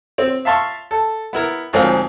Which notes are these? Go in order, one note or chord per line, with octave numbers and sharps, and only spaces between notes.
C4
E5 F5 A5 C6 C#6 E6
A4
B3 E4 A#4
D2 G#2 F3 C4 A#4 F5